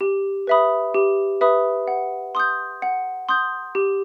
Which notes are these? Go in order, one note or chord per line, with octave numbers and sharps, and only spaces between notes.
G4
B4 E5 B5 D#6
G4
B4 E5 B5 D#6
F#5
C6 D#6 G6
F#5
C6 D#6 G6
G4